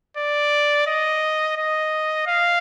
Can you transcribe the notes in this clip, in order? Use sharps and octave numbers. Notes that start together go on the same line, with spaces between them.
D5
D#5
D#5
F5